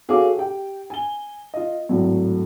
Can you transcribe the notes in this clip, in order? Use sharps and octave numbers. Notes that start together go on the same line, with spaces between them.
F#4 G#4 A4 C#5 F5 D6
G4 G5
G#5 G7
F4 D#5
G#1 A2 F#3